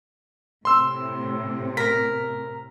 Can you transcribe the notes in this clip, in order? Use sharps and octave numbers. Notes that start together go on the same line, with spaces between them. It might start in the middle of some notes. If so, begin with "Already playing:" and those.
A2 C3 C6 E6
A#4 B6